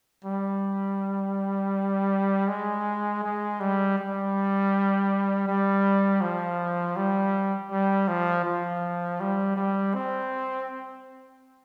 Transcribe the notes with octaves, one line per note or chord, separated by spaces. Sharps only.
G3
G#3
G#3
G3
G3
G3
F3
G3
G3
F3
F3
G3
G3
C4